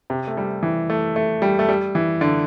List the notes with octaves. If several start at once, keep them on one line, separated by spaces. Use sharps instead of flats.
C3
A3
G3
E3
A3
A3
G3
A3
G3
E3
D3